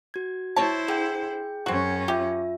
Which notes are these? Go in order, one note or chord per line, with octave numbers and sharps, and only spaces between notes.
F#4 G#6
E4 C5 C#5 A5
D3 G#4 G5 G6
F#2 C4 C#4 F#4
F4 G4 E5